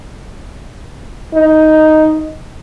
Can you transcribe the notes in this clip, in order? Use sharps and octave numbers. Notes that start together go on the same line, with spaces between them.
D#4